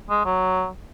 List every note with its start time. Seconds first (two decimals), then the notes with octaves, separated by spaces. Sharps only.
0.09 G#3
0.25 F#3